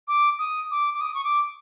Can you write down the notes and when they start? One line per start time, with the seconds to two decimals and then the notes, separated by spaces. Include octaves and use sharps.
0.08 D6
0.39 D#6
0.71 D6
0.94 D6
1.01 D#6
1.15 C#6
1.24 D6